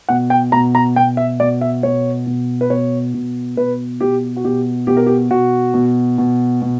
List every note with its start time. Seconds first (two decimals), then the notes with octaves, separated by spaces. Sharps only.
0.08 B2 F#5
0.30 G5
0.52 B2 A#5
0.75 A#5
0.96 B2 G5
1.17 E5
1.40 B2 D5
1.61 E5
1.83 B2 C#5
2.27 B2
2.61 B4
2.70 B2 C#5
3.14 B2
3.56 B2 B4
4.00 B2 G4
4.36 F#4
4.44 B2 G4
4.87 B2 G4
4.97 A#4
5.06 G4
5.30 B2 F#4
5.74 B2
6.18 B2
6.62 B2